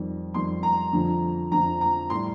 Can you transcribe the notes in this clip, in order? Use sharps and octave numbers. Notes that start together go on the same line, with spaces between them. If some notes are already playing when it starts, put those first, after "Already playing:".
Already playing: F2 D#3 G3
F2 D#3 G3 C6
A#5
F2 D3 F3
F2 D3 F3 A#5
A#5
A2 G3 C6